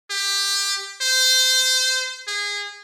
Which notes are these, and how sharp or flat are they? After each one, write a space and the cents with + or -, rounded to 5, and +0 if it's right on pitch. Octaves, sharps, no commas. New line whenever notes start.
G4 +15
C5 -20
G#4 -25